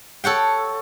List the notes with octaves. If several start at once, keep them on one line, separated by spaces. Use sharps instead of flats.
A4 C#5 F#5 G5